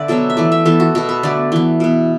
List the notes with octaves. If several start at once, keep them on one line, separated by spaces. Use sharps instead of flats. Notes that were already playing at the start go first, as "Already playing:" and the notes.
Already playing: D3 B4 D5 E5
B2 F#3 B3 A4
E5
E3 A3 D5
E5
E3 B3 A4
F#4
B2 B3 A4
B4
D3 A3 D5
E3 B3
B2 B3